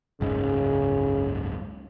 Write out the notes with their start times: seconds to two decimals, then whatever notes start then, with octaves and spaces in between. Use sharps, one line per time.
0.21 F#1 C#2 G#2 C#3